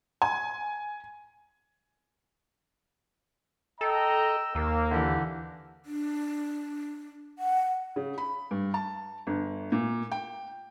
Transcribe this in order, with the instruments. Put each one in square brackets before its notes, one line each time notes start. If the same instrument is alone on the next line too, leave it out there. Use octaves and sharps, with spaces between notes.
[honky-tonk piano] G#5
[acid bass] A4 [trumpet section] D#5 G5 A#5 [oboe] E6
[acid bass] D#2 [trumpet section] A#3 [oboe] E6
[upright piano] D3 E3 [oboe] G4
[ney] D4
F#5
[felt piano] C#3
B5
G2
A5
G1
A#2
G5